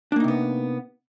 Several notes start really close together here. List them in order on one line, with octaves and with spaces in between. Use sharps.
D4 A#3 D#4 C3 B3